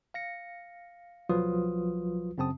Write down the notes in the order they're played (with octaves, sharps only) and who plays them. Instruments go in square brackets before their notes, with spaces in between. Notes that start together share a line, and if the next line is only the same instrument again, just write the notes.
[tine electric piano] F5 A#6 C#7
B1 F3 F#3 F4 B4 D#6
F#2 C#3 C4 A5 D#6